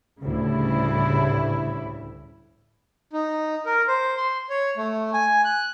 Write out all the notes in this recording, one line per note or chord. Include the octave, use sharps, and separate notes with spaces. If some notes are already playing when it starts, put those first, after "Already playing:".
D2 A2 C#3 G3 E4
D#4
A#4
C5
C6
C#5
A3
G#5
F#6